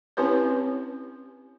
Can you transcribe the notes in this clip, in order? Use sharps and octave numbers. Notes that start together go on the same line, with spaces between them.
C4 C#4 E4 G4 B4 C#5